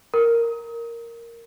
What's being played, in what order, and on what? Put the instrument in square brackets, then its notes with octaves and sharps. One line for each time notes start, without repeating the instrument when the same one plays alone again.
[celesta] A#4